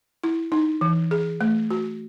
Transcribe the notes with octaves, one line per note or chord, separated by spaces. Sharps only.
E4
D#4
E3
G#4
A3
F#4